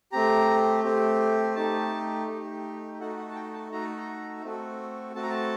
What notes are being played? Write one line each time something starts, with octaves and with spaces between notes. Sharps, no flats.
A3 C4 G4 A#5
A3 C4 G4
A3 D#4 G4 A5
A3 D#4 G4
A3 D#4 F#4 A4 F#5
F#5
A5
G5
A5
A3 D#4 F#4 A4 A#5
A#5
A3 C4 F#4 A4
A3 C4 F#4 A4 A5
A#5
A5